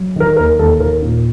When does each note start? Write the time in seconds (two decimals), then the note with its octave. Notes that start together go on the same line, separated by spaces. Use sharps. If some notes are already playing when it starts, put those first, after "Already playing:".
Already playing: F#3
0.16 D#3 A#4
0.37 D#2 A#4
0.59 D#2 A4
0.80 D#3 A#4
1.02 A#2